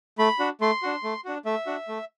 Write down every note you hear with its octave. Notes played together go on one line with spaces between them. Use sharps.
A3 B5
D4 F#4
A3 C6
D4 F#4
A3
D4 F#4
A3 E5
D4 F#4
A3